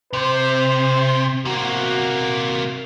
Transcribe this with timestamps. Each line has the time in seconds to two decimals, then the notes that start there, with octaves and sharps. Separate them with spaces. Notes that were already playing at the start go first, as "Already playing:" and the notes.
0.13 C3 C5
1.45 C3 A#3 F#4